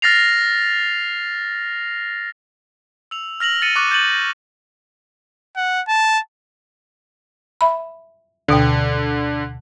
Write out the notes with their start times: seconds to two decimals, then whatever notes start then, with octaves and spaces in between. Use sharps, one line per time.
0.02 F6 A6 A#6 C7 F7
3.11 E6 F7
3.40 F6 A#6 F7 F#7
3.62 A6 C#7 D#7
3.76 C#6 D6 F#6 C#7
3.91 G6 A6 D#7 F#7
4.09 A#6
5.56 F#5
5.88 A5
7.61 E5 B5
8.48 D2 B2 D3 G5